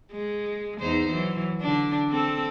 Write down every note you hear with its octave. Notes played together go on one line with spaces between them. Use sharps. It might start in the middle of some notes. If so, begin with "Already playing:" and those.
G#3
E2 D#4 C5
E3 F#3
D3 D4
C4 A4